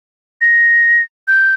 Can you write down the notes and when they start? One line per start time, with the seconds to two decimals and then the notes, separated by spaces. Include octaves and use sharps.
0.41 A#6
1.28 G6